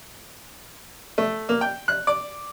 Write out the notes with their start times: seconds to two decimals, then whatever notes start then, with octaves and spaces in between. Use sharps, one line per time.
1.18 A3
1.49 A#3
1.61 G5
1.88 F#6
2.07 D5